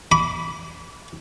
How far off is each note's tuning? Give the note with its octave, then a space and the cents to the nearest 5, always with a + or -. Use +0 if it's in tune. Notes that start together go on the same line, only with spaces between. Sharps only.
B5 +0 D6 -40